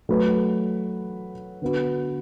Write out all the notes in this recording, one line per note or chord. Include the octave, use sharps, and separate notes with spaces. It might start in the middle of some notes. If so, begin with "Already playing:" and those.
F#3 A3 F#4 B4
D3 B3 F#4 B4